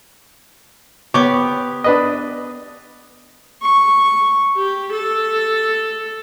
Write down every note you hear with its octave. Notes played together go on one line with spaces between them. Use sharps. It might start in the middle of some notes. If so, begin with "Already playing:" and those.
B3 G4 C#5 D6
D4 B4 D#5
C#6
G4
A4